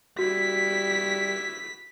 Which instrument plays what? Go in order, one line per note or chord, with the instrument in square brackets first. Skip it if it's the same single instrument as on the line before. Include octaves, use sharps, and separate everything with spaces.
[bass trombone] G3 [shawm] E4 [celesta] F#4 [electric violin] B6